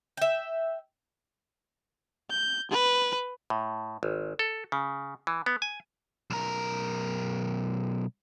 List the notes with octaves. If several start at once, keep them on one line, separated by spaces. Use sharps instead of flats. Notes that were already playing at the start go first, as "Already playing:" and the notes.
E5 G5
G6
B4
A2
G#1
A4
C#3
E3
B3
G#5
B1 A#4